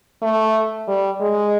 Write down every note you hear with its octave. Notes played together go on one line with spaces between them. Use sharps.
A3
G3
G#3